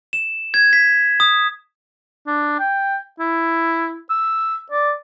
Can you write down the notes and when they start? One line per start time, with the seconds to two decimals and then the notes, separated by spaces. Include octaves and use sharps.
0.13 E7
0.54 G#6
0.73 B6
1.20 D#6
2.27 D4
2.59 G5
3.20 E4
4.10 E6
4.72 D5